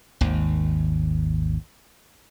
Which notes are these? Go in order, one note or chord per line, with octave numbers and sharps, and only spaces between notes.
G#1 D#2